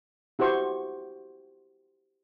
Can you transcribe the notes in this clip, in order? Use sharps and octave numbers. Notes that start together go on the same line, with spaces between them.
E4 F#4 G4 C5 C#6